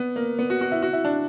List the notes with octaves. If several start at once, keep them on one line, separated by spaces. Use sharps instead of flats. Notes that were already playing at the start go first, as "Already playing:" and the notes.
Already playing: B3
A#3
B3
F#4
F#4
E4
F#4
E4
D4